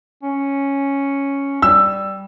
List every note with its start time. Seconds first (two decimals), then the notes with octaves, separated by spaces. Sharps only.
0.23 C#4
1.62 G3 E6